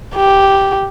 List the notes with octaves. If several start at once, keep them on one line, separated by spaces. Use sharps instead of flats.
G4